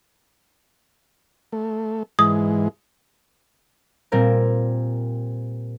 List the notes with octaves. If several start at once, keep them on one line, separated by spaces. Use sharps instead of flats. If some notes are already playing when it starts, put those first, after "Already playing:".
A3
G#2 E3 G#3 D#6
A#2 G3 C4 A#4 G#6